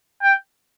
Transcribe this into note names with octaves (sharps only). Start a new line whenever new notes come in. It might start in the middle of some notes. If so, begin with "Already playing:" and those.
G5